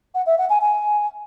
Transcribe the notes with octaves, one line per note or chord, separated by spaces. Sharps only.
F#5
E5
F#5
G#5
G#5